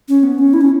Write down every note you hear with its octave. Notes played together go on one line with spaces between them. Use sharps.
C#4
B3
C#4
E4
C#4